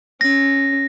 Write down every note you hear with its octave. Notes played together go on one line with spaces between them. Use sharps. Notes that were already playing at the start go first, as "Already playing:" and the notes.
C#4 A#6